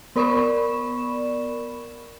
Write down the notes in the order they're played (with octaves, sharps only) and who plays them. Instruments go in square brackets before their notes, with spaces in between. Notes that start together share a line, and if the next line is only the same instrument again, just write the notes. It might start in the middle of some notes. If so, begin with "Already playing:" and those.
[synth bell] B3 A#4 D5 B5 C#6 E7